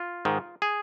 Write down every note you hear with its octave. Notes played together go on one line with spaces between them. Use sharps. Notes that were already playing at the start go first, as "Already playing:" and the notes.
Already playing: F4
G#2 D#3
G#4